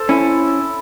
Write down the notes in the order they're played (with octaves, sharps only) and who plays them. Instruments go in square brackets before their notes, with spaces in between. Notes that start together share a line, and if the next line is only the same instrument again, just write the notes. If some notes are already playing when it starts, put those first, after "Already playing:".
Already playing: [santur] A4 C5
[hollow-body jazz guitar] C#4 [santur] E4